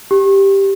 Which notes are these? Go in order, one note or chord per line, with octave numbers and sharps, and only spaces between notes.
G4